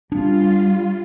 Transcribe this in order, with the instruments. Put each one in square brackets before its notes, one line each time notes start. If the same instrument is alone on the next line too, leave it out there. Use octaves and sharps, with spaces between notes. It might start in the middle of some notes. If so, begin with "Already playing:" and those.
[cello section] G3 F4 [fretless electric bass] D4